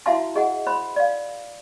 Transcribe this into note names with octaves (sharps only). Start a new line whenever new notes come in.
E4 F#4 E5 F5 A5 C6
G#4 D#5 F#5
C5 B5 C6
D5 F5